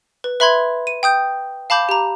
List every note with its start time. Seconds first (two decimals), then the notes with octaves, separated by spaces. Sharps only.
0.24 B4
0.40 B4 E5 B5 C6 G#6
0.87 D#7
1.03 G5 D#6 G6
1.70 F5 A5 B5 D6 G6
1.89 G4 A#5